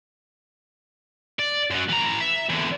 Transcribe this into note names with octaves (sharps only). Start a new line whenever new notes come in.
D5
F#2 F#3
E3 A#5
E5
E2 D3